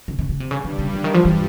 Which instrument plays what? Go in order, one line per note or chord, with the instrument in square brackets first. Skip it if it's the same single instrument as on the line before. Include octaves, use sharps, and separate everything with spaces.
[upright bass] C#3
C#3
C#3
C3
[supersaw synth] G2 G3 [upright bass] C#3
[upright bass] D3
C#3
D3
D#3
F3
E3